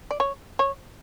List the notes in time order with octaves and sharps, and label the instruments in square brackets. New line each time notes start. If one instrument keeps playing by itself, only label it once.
[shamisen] D5
C#5
C#5